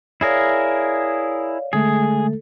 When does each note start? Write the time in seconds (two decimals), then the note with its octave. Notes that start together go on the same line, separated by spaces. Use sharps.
0.21 E4 G#4 A#4 C#5 D5 F5
1.73 D3 G#3 A3 G#4 A4